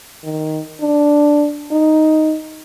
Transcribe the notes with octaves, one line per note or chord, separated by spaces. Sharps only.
D#3
D4
D#4